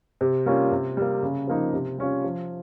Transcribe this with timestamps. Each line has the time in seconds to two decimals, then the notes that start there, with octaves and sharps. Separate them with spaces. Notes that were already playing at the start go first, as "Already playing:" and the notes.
0.21 C3
0.46 G3 A#3 C#4 F4
0.72 C3
0.97 G3 A#3
1.22 C#3
1.47 F3 A#3 D#4
1.73 C3
1.98 G3 C#4 F4
2.24 F3